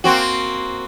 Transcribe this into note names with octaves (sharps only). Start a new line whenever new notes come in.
A#3 C4 F#4